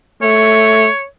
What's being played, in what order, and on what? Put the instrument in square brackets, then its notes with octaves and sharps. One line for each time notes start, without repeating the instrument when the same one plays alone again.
[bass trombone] A3 [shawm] C#5